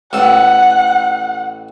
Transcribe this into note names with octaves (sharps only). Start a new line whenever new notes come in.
A1 A2 A4 F#5